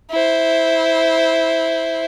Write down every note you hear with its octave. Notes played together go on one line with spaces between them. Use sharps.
E4 C5